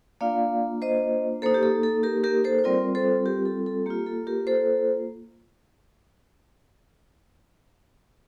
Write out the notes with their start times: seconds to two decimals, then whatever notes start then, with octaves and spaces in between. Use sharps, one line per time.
0.21 A#3 D4 F4 D5 F5
0.82 C5 D#5
1.42 A#3 D#4 A4 C5
1.54 G4
1.63 A4
1.83 A4
2.03 G4 A#4
2.24 G4 A#4
2.44 A4 C5
2.59 C5
2.64 G3 C4 F4 A#4 D5
2.95 A4 C5
3.26 G4 A#4
3.46 A4
3.66 A4
3.86 A#3 F4 G4
4.06 A4
4.27 G4 A#4
4.47 A4 C5